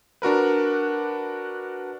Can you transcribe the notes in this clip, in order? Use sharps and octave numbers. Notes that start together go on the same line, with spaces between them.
D4 F#4 A#4 B4